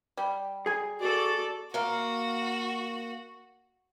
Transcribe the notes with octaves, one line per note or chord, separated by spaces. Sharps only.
G3
G#4 G#5
F#4 A4 D5
A#3 F#4 F5